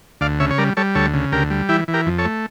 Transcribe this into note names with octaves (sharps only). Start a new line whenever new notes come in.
D2 D5 F5
C#3 C#5 E5
C#5
G3 A#4 D5
G3 A4 C#5
D2 A4 C#5
C#3
D2 G4 A#4
G3
E3 E4 G4
E3
G4 A#4
F2
A4 C#5
A3